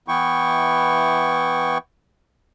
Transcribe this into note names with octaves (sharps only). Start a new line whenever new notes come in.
E3 B3 E4 G5 C#6